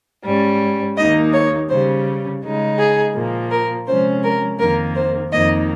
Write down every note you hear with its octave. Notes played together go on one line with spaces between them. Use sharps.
G#2 G3 C#4
D#2 D#3 A#3 D#4 D#5
C#5
C#3 G3 C#4 C5
C#3 G#3 D#4
G#4
A#2 F3 A#3
A#4
C3 F3 G#3 C#4 C5
A#4
F2 D#3 A#3 A#4
C5
F2 D#3 A#3 D#4 D#5